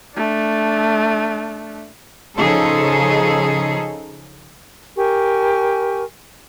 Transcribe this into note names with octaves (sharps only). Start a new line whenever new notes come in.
A3 D4
C#3 F3 D#4 G#4 A4
G4 A#4 G#5 C#6